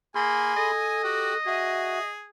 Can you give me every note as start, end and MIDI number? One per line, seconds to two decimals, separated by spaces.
0.15 0.53 58
0.15 0.71 68
0.15 0.99 80
0.15 0.71 83
0.15 0.71 84
0.56 1.37 69
0.56 2.11 75
1.04 1.35 66
1.04 1.33 67
1.04 1.33 79
1.46 1.99 66
1.46 2.29 68
1.46 2.00 76